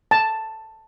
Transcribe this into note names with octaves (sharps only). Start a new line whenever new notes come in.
A5